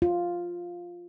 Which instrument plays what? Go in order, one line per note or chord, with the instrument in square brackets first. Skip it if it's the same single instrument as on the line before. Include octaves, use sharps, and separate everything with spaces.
[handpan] F4